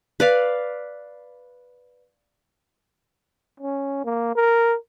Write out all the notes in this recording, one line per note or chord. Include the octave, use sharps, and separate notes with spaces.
B4 D5 F5
C#4
A#3
A#4